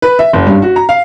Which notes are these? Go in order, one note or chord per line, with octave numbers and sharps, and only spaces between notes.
B4
E5
F#1
G2
F#4
A#5
F5